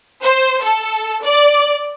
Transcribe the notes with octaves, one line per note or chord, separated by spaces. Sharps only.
C5
A4
D5